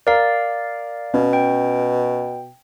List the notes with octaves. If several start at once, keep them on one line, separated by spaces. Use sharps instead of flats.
A#4 D5 F5
B2 C#4
G5